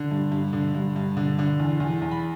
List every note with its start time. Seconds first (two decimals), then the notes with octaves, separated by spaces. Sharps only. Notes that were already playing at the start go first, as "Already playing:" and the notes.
Already playing: D3
0.11 G2
0.32 G2
0.53 D3
0.74 G2
0.96 G2
1.17 D3
1.39 D3
1.59 E2
1.80 E2
2.01 E2
2.11 B5